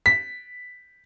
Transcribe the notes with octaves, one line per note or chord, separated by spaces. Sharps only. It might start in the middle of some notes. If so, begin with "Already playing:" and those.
B6